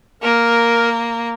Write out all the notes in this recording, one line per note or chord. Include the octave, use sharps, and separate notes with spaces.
A#3 A#4